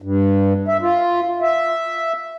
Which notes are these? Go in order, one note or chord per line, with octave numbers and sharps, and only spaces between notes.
G2
E5
F4
E5